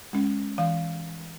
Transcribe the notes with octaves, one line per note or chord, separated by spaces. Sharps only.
G#3 C#4
E3 F5